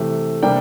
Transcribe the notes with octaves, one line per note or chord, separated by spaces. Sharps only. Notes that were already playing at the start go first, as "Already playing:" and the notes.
Already playing: C3 E3 A3
C3 G3 A#3 D4 G5